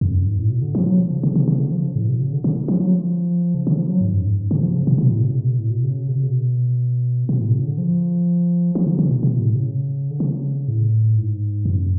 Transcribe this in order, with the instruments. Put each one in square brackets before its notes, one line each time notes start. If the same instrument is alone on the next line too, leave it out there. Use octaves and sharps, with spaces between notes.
[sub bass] F2
F#2
G#2
A2
B2
D3
F3
F#3
F3
C#3
C#3
C#3
C#3
D3
F3
C#3
A2
B2
C#3
D3
D3
F3
F#3
F3
C#3
D3
F3
F#3
G#2
F#2
G#2
C#3
F3
C#3
B2
B2
A2
C#3
B2
A2
B2
C#3
B2
C#3
B2
B2
A2
C#3
D3
F3
F3
D3
C#3
B2
B2
A2
C#3
D3
C#3
A2
G#2
F#2